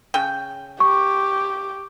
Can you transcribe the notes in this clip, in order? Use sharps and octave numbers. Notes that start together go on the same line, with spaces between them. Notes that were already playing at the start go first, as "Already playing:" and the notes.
C#3 G5
G4 C#6